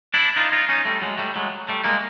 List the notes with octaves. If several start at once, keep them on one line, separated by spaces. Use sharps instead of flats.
D4 E4
D#4 F4
D#4 F4
C#4 D#4
G3 A3
F#3 G#3
G3 A3
F#3 G#3
G3 A3
G#3 A#3